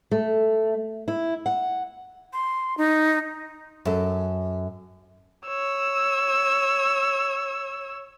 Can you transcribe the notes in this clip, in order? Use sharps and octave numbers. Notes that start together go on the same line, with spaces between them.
A3
E4
F#5
C6
D#4
F#2 A4
C#5 E6